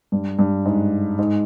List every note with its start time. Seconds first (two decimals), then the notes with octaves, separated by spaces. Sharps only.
0.12 G2
0.39 G2
0.65 G#2
1.18 G#2